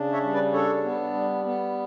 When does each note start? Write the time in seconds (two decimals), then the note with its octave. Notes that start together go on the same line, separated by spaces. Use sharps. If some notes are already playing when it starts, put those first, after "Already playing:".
Already playing: C#3 D4
0.12 C#5 E5
0.23 G3
0.33 B4 D5
0.53 D4 A4 C#5
0.84 B3
1.14 G3
1.45 B3